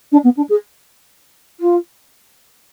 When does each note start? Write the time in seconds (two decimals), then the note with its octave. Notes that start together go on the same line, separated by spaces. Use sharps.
0.11 D4
0.23 B3
0.36 D4
0.49 G#4
1.60 F4